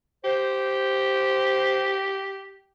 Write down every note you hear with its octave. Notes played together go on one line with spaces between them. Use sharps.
G4 C5